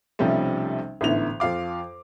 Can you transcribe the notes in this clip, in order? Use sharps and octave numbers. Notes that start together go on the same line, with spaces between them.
B1 C3 F3 G3 A3 C#4
A1 G#2 D3 B3 E4 F7
F2 F4 F5 D6